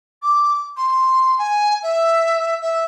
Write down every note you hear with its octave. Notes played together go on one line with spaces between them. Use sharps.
D6
C6
G#5
E5
E5